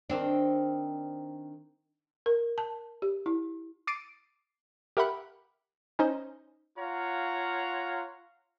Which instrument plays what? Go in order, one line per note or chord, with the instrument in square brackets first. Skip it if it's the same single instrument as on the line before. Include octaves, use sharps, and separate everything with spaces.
[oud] D#3 C4 D4
[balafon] A#4
A5
G4
E4
[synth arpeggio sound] D6 A6 C7 D7 D#7
G4 A#4 E5 F#5 B5 F#6
C#4 D#4 C5 D#5
[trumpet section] F4 C#5 F5 F#5 A#5